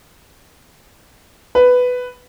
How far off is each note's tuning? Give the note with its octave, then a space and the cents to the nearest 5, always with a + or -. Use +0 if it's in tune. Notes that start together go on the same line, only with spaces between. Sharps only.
B4 +10